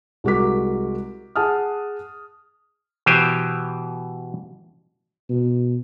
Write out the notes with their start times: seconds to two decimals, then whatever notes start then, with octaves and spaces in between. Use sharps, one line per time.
0.24 C2 G#3 F#4 A#4 D6 B6
1.36 G#4 F#5 G#5 A5 D#6 F6
3.06 B2 E3 G4 C5 G#5
5.30 B2